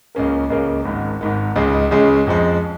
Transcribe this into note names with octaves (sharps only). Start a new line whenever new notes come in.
C#2 C#3 A#3 C#4 A#4
C#2 C#3 A#3 C#4 A#4
G#1 G#2 D#3
G#1 G#2 D#3
C#2 C#3 G#3 C#4
C#2 C#3 G#3 C#4
F2 F3 G#3